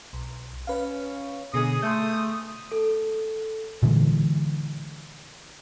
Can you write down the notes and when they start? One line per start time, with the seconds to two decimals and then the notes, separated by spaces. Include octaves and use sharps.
0.13 B1
0.67 C#4 B4 F5
1.54 B2 D3 G#4 D#6
1.82 A3 C6 G6
2.72 A4
3.83 A#2 D3 E3 G#3